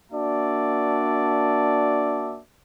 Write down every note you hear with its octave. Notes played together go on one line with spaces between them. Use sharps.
A#3 D4 F#4 D5 E5 A5